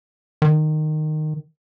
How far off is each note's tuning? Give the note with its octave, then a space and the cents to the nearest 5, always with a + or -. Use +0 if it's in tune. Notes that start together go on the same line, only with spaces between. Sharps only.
D#3 -15